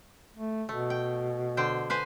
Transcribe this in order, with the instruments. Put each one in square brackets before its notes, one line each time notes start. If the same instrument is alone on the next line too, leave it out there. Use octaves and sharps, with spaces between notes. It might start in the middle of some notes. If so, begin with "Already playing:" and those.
[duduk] A3
[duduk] B2 [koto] A3
[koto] G5
D3 C5 G5
B4 C5 G#5